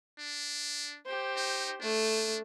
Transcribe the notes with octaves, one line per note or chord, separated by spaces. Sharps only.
D4
G4 C5
D#4
A3 D4